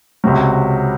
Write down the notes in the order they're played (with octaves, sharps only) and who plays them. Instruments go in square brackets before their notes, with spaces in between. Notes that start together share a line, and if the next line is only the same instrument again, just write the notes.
[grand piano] C#2 C3 F#3